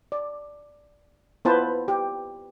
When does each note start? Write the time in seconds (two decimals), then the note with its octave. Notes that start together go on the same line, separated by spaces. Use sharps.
0.12 D5
1.45 B3 E4 F4 B4 C5 A5
1.88 G4